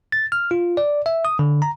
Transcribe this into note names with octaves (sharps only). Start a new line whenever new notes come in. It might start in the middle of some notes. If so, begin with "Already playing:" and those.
A6
F6
F4
D5
E5
D#6
D3
A#5